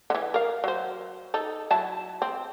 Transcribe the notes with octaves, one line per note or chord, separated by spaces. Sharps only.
D3 E3
A#4 F5
F#3 C5
D#4 A4
F#3 E4 A5
C4